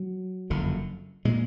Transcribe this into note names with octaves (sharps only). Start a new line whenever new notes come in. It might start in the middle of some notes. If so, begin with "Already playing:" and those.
Already playing: F#3
F#1 F2 D3
A#2 G#3